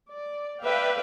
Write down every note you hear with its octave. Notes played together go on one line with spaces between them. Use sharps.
D5
B4 D5 E5 F5 G5